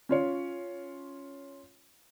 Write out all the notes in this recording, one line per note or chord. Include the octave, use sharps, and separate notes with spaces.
C#4 F4 C#5